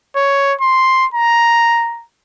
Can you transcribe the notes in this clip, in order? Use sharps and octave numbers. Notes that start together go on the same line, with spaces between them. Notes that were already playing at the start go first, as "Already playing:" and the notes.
C#5
C6
A#5